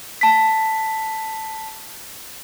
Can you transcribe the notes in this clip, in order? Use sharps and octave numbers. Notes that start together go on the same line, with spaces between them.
A5 B6